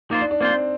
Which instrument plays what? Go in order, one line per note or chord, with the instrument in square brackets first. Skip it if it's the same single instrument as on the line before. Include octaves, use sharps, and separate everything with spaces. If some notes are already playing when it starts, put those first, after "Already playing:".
[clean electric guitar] A#3 F4 C5 [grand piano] D#4
[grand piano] D4
D4
[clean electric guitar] A#3 F4 C5 [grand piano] C4